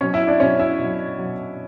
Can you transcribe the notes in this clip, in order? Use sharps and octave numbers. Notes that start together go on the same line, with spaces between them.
B2 F#3 C#4 C#5
E4 E5
D4 D5
B2 F#3 C#4 C#5
E4 E5
B2 F#3
B2 F#3